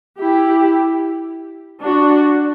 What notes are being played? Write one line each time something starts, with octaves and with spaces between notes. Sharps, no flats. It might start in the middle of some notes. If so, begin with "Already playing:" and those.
E4 G4
D4 F#4